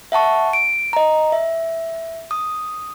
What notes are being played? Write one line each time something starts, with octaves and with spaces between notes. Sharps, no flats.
E5 F#5 A5 C#6
D7
D#5 A#5
E5
D#6